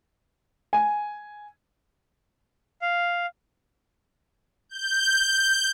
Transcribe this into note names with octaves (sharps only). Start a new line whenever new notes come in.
G#5
F5
G6